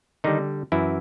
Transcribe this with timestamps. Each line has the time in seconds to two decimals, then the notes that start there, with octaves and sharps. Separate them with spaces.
0.24 D3 D#3 G3 D#4
0.72 F#2 E3 E4